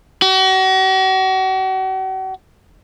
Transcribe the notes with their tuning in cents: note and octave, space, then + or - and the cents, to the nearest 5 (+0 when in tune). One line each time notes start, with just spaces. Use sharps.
F#4 +40